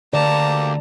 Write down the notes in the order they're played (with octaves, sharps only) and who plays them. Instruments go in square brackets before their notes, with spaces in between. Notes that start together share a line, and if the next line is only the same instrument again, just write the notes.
[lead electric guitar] D2 [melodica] A#3 G4 [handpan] D5 [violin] A5 A#5